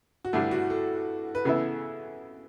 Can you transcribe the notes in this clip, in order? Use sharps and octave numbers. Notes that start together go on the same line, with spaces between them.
F#4
G2 D3 A3 E4
F#4
A4
B4
C#3 E3 B3 E4 A4